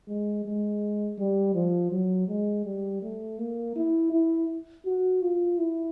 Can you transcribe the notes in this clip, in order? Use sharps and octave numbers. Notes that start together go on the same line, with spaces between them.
G#3
G#3
G3
F3
F#3
G#3
G3
A3
A#3
E4
E4
F#4
F4
E4